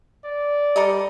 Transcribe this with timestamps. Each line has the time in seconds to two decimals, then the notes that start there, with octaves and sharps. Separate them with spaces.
0.25 D5
0.76 G3 A4 A#4 D#5